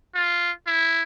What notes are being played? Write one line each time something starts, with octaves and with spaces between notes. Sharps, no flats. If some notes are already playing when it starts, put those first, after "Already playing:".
F4
E4